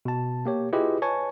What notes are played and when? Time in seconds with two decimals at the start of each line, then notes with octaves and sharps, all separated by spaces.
0.05 B2 A5
0.45 A#3 G4 C#5
0.73 E4 F4 G4 G#4 B4 D#5
1.02 B4 C#5 G#5 A5 C#6